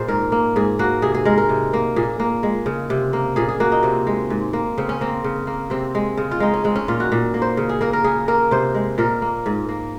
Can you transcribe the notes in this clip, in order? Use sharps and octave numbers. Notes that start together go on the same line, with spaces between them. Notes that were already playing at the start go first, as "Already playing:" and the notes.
Already playing: A#2 G#3 A#3 G#4 C5
G#2 A#4
A#3
G#2 G#4
A#3 F#4
C3 G#4
G#4
G#3 A#4
A#4
C3
A#3
A#2 G#4
A#3
G#3
C#3
C3
A#3
A#2 G#4
G#4
A#3 F#4
D#4
C3 C4
G#3
G#2
A#3
C#3 C4
C#4
A#3 C4
C#3
A#3
C3 C4
G#3
C#3
F4
G#3 D#4
C#4
G#3 C4
C#4
A#2 F4
F#4
A#2
A#3
C5
C#3
G#4
A#3 A#4
A#4
C#3 G#4
A#3 A#4
C3 C5
G#3
A#2 A#4
A#3
G#2
A#3